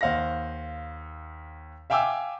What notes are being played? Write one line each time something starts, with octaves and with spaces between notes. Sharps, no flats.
D#2 C5 F5 F#5 A#6
E5 F5 G5 G#5 D6 E6